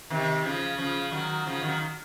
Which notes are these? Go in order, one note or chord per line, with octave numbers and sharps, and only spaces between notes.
C3 D#3
C#3 F3
C#3 F3
D#3 F#3
C#3 F3
D#3 F#3